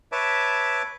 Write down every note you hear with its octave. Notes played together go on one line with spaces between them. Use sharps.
B4 C#5 E5 A5 D6